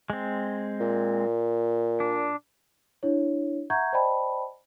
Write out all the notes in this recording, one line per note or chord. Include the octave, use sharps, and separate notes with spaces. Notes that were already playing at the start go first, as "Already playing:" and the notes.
G#3 C4
A#2
D4
D4 E4 C#5
E5 F#5 A#5 C#6 G6 G#6
C5 D5 D#5 G5 A5 B5